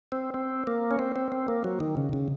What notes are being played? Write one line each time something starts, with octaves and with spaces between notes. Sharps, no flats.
C4
C4
A#3
C#4
C4
C4
C4
A#3
F#3
D#3
C#3
C#3